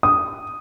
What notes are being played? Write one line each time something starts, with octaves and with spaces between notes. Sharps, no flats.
D#6